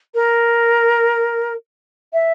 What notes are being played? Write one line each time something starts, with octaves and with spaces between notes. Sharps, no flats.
A#4
E5